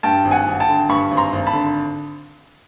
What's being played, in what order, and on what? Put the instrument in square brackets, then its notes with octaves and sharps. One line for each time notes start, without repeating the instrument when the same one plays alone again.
[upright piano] G2 G5 A5
G#1
F#5 G#5
G#1
G5 A5
D3
G2 B5 C#6
G#1
A#5 C6
G#1
A5 B5
D3